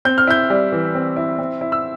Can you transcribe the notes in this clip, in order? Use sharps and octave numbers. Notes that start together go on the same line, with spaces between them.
C4 G6
F6
E4 G6
G3
E3
C4
E4
C4
E4
E6